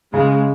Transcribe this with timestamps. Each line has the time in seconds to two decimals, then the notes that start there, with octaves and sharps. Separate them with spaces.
0.13 C#3 G#3